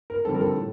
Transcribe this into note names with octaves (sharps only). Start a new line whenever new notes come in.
A#4
F2 D3 G3 C4 A4
A#4
A4
A2